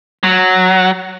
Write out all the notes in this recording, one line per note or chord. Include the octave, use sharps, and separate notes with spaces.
F#3